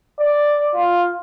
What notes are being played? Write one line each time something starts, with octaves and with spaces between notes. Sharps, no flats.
D5
F4